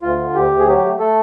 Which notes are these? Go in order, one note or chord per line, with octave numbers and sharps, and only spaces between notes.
D2 F4
D3
D2 G4
D2
G#4
F#3 G4
G4
A3
A3 A4